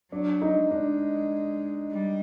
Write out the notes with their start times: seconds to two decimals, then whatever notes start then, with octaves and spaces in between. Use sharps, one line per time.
0.12 F#3 D4
0.42 D#4
0.57 G#3
0.71 D4
1.91 G3